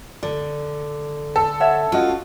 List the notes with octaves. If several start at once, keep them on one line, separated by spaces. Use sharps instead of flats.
D3 D5
A4
C#5 E5 F#5
C#4 F4 F#4 D#5